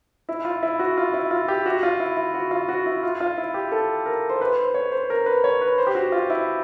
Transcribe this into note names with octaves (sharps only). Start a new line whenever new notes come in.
E4
F4
E4
F#4
F4
E4
F4
G4
F#4
F4
E4
E4
F#4
F4
F#4
E4
F4
F4
E4
G4
A4
A#4
C5
B4
C5
C#5
C5
A#4
B4
C#5
B4
C5
G4
F#4
F4
E4